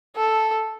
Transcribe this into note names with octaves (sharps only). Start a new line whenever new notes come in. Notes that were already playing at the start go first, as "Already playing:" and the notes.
A4